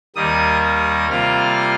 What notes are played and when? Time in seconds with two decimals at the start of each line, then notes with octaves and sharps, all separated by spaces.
0.15 D#2 D#3 G3 A#3 D#6
0.63 D#6
1.10 C3 G3 A#3 F4 F6